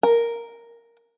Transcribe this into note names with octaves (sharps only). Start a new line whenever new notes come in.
A#4